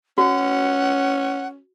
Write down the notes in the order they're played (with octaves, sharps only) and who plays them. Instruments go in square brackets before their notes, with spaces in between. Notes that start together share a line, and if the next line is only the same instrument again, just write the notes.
[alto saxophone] C#4 [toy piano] F#4 [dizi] F#5